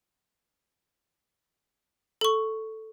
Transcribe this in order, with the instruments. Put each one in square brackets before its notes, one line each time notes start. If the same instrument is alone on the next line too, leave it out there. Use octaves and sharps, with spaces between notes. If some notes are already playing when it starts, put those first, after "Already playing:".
[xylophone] A4 C#6